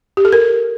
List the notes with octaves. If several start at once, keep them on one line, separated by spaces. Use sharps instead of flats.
G4
A4
A#4